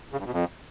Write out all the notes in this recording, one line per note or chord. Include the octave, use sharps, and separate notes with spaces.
C#3
G2
B2
F2